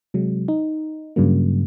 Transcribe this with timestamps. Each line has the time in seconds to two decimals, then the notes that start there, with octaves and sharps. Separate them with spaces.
0.14 C3 F#3 G#3
0.48 D#4
1.16 G2 C#3 F#3 A#3